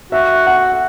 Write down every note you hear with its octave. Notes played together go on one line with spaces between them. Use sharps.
F#4 E5
F#5